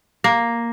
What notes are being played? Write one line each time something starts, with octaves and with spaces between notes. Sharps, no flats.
A#3